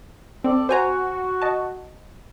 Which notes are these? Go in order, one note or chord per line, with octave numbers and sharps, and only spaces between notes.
C4 A4 D5
F#4 C5 G#5 A#5
D#5 A5